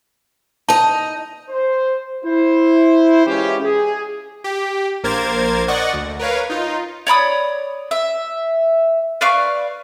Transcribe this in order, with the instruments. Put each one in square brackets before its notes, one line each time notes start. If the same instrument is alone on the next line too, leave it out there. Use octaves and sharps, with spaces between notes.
[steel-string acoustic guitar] D#4 D#5 [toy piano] A5
[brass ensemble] C5
E4 C5
E3 G#3 C#4 E4 F4 G4
G#4
[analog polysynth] G4
A#1 A#3 A#4 C5 G#6 A6
D5 D#5 F#5 C#6
D2
A#4 B4 C#5 F5
D#4 F4
[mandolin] C#5 D5 B5 D#6
E5
B4 D5 F5 C#6